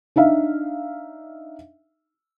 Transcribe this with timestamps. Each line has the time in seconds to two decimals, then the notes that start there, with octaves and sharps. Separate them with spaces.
0.16 D4 D#4 E5 F5